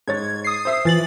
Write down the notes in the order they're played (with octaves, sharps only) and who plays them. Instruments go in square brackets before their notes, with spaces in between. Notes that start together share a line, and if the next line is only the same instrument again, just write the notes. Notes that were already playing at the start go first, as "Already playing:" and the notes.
[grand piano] G#2 C#5 A6 [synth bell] G#6
[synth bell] D#6 C7
[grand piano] C5 E5
[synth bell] E3 A6 F#7 [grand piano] F3